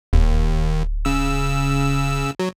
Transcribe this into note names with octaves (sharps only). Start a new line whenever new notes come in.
D1 D#2
C#3 E6
F#3